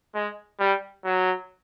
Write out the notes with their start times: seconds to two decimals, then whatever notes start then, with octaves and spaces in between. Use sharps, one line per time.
0.15 G#3
0.60 G3
1.05 F#3